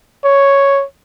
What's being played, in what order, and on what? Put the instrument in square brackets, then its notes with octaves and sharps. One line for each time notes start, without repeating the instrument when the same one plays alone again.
[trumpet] C#5